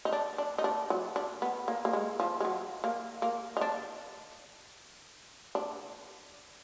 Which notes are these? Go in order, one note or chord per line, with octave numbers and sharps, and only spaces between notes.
D#4
D4
D4
D#4
D4
F#3
D4
B3
A#3
A#3
G#3
F3
G#3
F#3
A#3
A#3
D#4
D4
D4